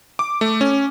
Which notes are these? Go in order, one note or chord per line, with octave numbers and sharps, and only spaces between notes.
D6
A3
C#4